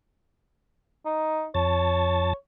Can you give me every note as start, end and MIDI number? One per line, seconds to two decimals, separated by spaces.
1.06 1.46 63
1.55 2.33 41
1.55 2.35 73
1.55 2.33 81